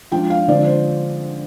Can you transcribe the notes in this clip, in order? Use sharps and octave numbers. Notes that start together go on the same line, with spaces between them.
F3 G#3 D4 F4 G5
F5
D3 F3 G#3 C4 D5
C5